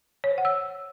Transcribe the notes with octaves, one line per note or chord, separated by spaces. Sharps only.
C#5
C5
F#5
E6